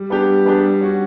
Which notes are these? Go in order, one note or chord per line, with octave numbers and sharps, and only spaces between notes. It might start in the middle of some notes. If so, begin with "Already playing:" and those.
Already playing: G3
B3 D4 G4
G3
B3 D4 G4
G3
C#4 F#4